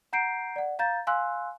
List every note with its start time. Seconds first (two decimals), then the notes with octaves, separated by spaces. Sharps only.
0.13 F#5 A#5 G6 C7 D7
0.56 D5 F#5
0.79 F5 A#5 G6 A6
1.07 F5 G#5 C6 E6 F#6